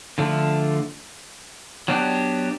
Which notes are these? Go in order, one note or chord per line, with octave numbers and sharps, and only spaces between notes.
D3 F3 A3 D4
F#3 B3 D4 G4